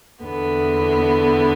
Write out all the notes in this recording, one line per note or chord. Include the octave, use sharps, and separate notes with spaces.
E2 D3 B3